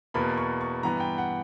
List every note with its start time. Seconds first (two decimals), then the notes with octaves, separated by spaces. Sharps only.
0.14 E2 B2 A#3 B5
0.38 C#6
0.61 C#6
0.83 G2 E3 B3 A#5
1.00 G5
1.18 F#5